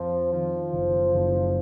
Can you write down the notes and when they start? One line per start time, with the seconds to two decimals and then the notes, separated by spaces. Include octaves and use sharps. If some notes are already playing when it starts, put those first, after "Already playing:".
Already playing: F2 F3
0.32 D#3 F3
0.73 F#1
1.14 F#1